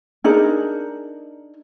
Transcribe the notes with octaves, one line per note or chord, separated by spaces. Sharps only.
D4 D#4 G#4 A#4